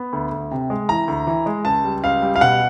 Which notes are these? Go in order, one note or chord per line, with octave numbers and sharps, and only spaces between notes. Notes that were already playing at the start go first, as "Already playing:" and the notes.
Already playing: B3
D2
D2
C3
G#3
E3 A#5
D2
E3
G#3
C#2 A5
G3
C#2 F5
G3
F5
B2 F#5